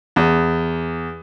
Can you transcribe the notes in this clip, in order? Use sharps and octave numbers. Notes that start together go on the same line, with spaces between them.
E2